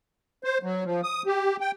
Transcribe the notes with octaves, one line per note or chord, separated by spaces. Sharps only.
C5
F#3
F3
D#6
G4
G5